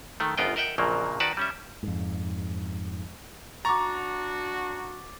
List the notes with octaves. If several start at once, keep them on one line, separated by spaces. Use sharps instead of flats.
D#3 A3
G1 F#2 B3 F4 D#5 G5
A#4 D#5 E5 F#5 G5
A#1 F2 A#2 C#3 F#3 A#3
D#3 F#4 B4 D5 A5
G3 C#4 E5
F2 G#2
D4 F#4 A#5 C#6 D6 A6